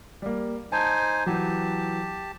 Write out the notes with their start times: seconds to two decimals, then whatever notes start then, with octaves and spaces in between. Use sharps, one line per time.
0.22 G3 A#3
0.72 D#4 C5 G#5 A5
1.26 E3 F#3 G4 A5